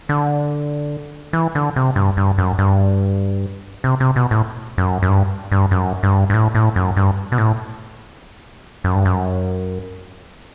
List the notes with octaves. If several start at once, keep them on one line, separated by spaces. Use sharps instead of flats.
D3
E3
D3
C3
G2
G2
F#2
G2
C3
C3
B2
A2
F#2
F#2
G2
G2
F#2
G2
G2
A2
A2
F#2
G2
B2
A2
F#2
G2
F#2